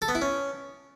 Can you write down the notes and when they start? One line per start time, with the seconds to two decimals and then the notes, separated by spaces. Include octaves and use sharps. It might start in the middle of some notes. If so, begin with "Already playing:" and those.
0.02 A4
0.08 B3
0.15 E4
0.22 C#4